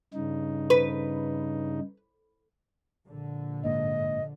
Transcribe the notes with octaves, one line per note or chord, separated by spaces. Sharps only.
G2 C#3 D#4
B4
A#1 D3
G1 G#2 A#3 D#5